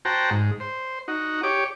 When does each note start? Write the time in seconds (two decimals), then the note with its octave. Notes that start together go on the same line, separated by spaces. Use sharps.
0.05 F#4 C5 G5 A5 A#5
0.30 G#2
0.60 C5
1.08 D#4 F#4
1.43 G4 C#5 D6